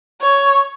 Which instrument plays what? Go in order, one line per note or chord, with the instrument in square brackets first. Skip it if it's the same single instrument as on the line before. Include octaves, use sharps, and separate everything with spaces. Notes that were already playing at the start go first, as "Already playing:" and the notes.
[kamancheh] C#5